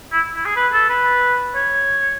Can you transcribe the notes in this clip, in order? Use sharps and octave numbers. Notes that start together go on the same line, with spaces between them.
E4
E4
G#4
B4
A4
B4
C#5